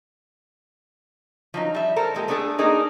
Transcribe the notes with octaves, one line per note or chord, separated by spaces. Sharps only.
F3 F#3 D#4
G3 E5
A4 A#4 C5
A#2 G#3 G4
A3 B3 D4 G#4 A4
A#3 D4 D#4 G#4 A#4